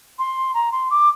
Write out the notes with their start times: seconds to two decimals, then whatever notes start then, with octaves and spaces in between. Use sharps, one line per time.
0.19 C6
0.54 A#5
0.72 C6
0.90 D6